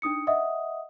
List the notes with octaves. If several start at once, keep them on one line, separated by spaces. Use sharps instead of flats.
D4 D#4 D#6 C#7
D#5 E5 F#5 D#6